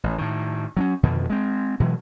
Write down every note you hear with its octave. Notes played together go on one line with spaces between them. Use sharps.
A1
A2 D#3
F#3 C4 C#4
F2 B2 D3 D#3
G#3 C4
B2 E3 F#3 G#3